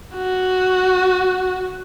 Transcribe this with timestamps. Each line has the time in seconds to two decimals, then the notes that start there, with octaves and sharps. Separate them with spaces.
0.15 F#4